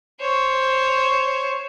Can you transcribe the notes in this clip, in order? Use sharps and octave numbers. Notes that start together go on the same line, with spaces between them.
C5 C#5